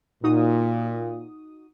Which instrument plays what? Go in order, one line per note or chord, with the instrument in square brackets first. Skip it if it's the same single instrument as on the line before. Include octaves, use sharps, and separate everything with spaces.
[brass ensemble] A#2 [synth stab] D#4 F#4 D#6